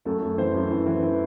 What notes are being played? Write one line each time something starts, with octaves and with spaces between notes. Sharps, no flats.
F#2 A3 A4
F#2
E3 C4 C5
F#2
E3
E3
E3